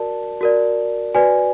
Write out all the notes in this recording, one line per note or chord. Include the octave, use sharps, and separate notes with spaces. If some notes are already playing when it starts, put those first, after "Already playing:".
Already playing: F#4 A#4 D5 A5
F#4 A#4 D5
F#4 B4 D5 G#5